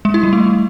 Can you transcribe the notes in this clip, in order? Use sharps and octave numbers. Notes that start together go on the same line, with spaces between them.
G#3
E4
G3
A3